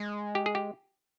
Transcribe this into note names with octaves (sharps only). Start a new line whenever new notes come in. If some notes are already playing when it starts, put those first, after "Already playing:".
Already playing: G#3
G4
G#4
G4